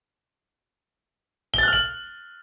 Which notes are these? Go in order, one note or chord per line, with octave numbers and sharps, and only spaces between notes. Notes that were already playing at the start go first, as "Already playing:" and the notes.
F6 F#6 A6 F#7 G7